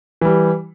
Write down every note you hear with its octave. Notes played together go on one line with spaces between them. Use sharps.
E3 G3